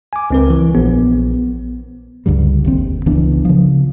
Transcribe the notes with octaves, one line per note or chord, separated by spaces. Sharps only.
G#5 D6
C#2 C4 A#4
E3
A#1 B3
C#2 G2 D3 G3
G1 D#2 C4
C#2 E3 B3 D4
C#3 F3